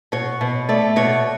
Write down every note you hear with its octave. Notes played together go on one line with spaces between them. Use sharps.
B2 C#5
B2
A3 D5
B2 C#5